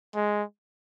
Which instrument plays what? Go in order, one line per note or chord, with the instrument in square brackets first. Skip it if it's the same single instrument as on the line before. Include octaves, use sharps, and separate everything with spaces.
[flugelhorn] G#3